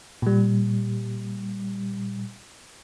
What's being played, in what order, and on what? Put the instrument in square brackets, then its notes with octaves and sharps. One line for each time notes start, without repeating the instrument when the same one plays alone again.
[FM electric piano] A#2 G3